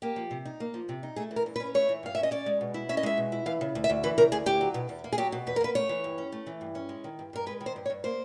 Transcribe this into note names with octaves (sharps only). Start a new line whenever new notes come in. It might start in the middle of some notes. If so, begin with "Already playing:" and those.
A#3 G4
F3
C3
D#4
A#3
F3
C3
D#4
A3 G#4
E3
A#4
G2
B4
C#4
A3 C#5
E3
G2 F5
C#4 E5
D#5
C#4 D5
G#3
B2
E4
C#4 E5
D#5
G#3 E5
B2
E4
E3 F5
C#3
D2
E5
D2
E3 B4
C#3 A#4
D2 G#4
D2 G4
F#3
B2
E2
A#3
G#4
F#3 G4
B2
E2 B4
A#4
A#3 B4
A3 C#5
E3
G2
C#4
A3
E3
G2
C#4
G#3
D#3
G2
G2 A#4
G#3 B4
D#3
C5
G2
C#5
G2
A#3 C5